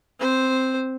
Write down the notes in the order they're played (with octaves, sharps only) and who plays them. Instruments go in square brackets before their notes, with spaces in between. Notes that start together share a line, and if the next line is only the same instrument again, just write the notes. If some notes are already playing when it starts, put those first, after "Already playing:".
[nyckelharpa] C4 C5